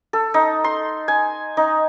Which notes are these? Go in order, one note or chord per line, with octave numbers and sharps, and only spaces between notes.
A4
D#4
C6
G#5
D#4